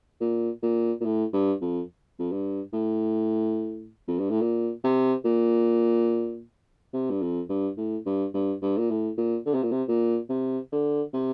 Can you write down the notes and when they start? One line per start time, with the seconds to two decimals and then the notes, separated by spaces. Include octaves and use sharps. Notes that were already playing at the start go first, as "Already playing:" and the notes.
0.21 A#2
0.63 A#2
1.00 A#2
1.05 A2
1.33 G2
1.62 F2
2.19 F2
2.32 G2
2.73 A2
4.08 F2
4.19 G2
4.30 A2
4.41 A#2
4.84 C3
5.25 A#2
6.93 C3
7.10 G2
7.22 F2
7.49 G2
7.77 A2
8.06 G2
8.34 G2
8.62 G2
8.77 A#2
8.90 A2
9.17 A#2
9.46 D3
9.54 C3
9.63 A#2
9.72 C3
9.88 A#2
10.29 C3
10.72 D3
11.14 C3